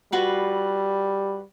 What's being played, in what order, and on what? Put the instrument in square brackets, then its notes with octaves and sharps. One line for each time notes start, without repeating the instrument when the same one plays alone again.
[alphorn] G3 [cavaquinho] F4 F#4 B4